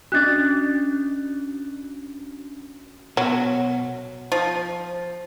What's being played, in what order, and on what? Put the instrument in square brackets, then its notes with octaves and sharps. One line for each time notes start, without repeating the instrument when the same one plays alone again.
[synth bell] C#4 D4 F#4 [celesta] F#6 A6
[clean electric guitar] B2 [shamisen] F#3
[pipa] F3